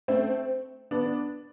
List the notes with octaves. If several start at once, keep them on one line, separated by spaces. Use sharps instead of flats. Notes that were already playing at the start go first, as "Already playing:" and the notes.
A3 C4
B3 D4